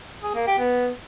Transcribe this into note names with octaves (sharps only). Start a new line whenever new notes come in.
G#4
A#3
G4
B3